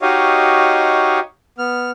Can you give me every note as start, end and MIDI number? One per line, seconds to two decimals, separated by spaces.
0.02 1.19 63
0.02 1.19 66
0.02 1.19 67
0.02 1.19 73
0.02 1.19 75
0.02 1.19 77
1.58 1.91 59
1.58 1.91 89